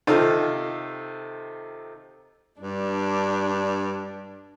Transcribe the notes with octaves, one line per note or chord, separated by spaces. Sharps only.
C3 D#3 D#4 F4 A4
G2 D4